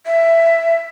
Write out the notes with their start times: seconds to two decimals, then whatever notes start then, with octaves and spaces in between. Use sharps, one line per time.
0.06 E5